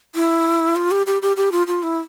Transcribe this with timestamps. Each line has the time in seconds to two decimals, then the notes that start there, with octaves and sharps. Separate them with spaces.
0.15 E4
0.76 F4
0.91 G4
1.06 G4
1.22 G4
1.37 G4
1.52 F4
1.67 F4
1.83 E4